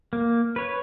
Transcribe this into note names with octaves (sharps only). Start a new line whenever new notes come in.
A#3
B4 C#5